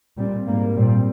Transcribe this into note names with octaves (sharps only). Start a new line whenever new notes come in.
A#2 G3 C4
G#2 G3 A#3
A#2 G3 C4